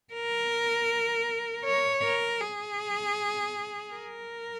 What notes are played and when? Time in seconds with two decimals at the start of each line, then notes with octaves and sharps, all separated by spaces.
0.13 A#4
1.65 C#5
2.03 A#4
2.41 G#4
3.93 A#4